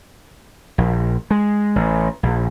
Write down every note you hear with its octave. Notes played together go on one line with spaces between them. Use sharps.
A#1
G#3
A1
A#1